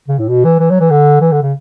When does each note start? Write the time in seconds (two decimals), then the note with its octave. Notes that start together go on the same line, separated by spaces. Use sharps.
0.08 C#3
0.19 A2
0.29 B2
0.44 E3
0.59 E3
0.70 F#3
0.80 E3
0.90 D3
1.21 E3
1.32 D3
1.42 C#3